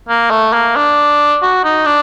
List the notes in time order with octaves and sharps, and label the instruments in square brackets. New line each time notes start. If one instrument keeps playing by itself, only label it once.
[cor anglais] A#3
A3
A#3
D4
F#4
D#4
D4